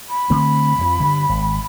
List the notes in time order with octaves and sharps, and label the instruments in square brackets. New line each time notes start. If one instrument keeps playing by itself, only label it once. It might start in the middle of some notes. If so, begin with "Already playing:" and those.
[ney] B5
[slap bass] D3 A3 C4
F2 F3
G2 D3
G#1